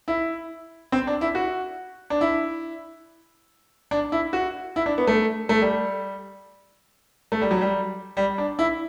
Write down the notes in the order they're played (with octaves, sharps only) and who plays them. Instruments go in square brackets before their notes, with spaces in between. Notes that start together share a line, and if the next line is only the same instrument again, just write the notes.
[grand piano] E4
C4
D4
E4
F#4
D4
E4
D4
E4
F#4
E4
D4
B3
A3
A3
G3
A3
G3
F#3
G3
G3
D4
E4